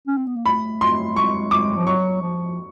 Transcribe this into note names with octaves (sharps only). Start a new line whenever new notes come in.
C#4
C4
B3
A#3
A3 B5
C6
G#3 C#6
D6
F3
F#3 C#6
F3